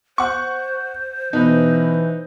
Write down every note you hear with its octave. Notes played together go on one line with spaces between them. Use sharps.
C5 F#5 C#6
B2 E3 D#4 B4